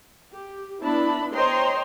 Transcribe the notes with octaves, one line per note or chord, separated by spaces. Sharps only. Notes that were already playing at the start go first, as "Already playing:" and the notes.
G4
B3 D4 E4 A5 B5
C5 C#5 D#5 G5 A#5 C6